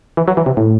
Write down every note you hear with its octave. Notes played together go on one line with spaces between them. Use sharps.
E3
F#3
E3
C3
A2